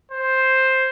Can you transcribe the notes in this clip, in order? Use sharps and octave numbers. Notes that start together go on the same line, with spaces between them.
C5